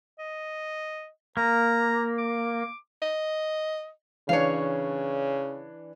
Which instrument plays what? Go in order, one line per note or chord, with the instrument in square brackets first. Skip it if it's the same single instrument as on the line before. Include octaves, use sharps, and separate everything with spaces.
[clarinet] D#5
[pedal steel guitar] A#3 [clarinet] A#5
[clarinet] D6
[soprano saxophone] D#5
[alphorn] C#3 [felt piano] E3 D4 [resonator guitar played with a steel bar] C#5 F5